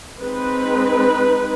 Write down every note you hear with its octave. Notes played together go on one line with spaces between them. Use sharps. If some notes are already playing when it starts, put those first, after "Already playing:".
G#3 C4 D#4 B4